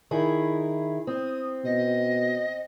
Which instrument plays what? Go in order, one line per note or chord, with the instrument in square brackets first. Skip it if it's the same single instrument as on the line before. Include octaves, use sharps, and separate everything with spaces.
[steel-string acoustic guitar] D#3 E4 G#4
[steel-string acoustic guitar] C4 [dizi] D#6
[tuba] B2 [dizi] D#5